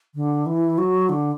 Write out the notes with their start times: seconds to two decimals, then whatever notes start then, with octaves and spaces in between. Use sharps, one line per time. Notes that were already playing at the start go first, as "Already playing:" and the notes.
0.15 D3
0.46 E3
0.78 F#3
1.09 D3